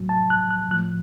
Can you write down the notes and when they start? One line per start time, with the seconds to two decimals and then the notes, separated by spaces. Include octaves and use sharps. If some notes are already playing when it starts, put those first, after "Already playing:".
Already playing: A2 F#3
0.09 A5
0.30 F#6
0.50 F#6
0.71 A2 F3 F#6